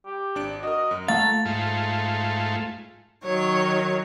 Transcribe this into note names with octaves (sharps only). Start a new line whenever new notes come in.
G4
G#1 D4 D7
F#4 A#4 D#5
F#2
A3 F4 A4 F5 F#5 A#5 A6
G#2 A3 F4
D#3 F#3 C#5